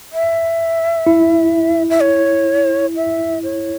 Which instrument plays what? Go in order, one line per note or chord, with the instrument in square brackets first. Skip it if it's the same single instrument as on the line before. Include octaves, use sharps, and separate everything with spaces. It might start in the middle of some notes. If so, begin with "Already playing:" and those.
[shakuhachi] E5
[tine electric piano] E4
[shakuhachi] E5
C#5
E5
C#5